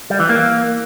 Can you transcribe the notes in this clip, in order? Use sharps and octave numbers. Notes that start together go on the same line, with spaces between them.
G3
E3
A#3